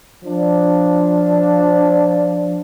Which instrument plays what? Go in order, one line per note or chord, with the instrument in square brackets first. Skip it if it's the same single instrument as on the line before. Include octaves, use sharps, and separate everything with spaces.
[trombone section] F3 D4